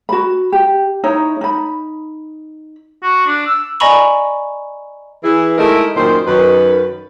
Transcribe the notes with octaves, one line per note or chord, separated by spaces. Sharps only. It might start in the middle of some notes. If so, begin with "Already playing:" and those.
F#4 B5
G4
D#4 E4 C#5
D#4 B5
F#4
D4
E6
D5 D#5 G#5 A#5 B5 C#6
E3 E4 G#4
G#3 A3 D#4 E4 A4 A#4
F#2 A#2 D#3 C5
F#2 D#3 B4